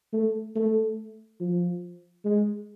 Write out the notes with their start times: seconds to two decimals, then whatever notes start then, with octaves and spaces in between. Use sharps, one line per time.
0.13 A3
0.55 A3
1.40 F3
2.25 G#3